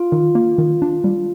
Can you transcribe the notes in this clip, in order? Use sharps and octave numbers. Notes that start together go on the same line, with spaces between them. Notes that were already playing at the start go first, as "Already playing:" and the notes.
Already playing: F4
D#3
A#3
D#3
D4
G3